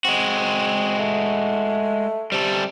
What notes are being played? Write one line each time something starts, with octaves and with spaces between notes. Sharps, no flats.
G#3 C4 F#4
A3
C3 G3 A4